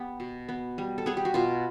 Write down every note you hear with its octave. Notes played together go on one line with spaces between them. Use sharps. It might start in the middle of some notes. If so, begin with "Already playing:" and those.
Already playing: B3 G4
B2
B3
G3
A4
B3 G#4
G4
F#4
B2 F4